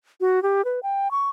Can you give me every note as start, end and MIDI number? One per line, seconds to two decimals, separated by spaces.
0.21 0.42 66
0.43 0.64 67
0.65 0.80 71
0.83 1.11 79
1.11 1.30 85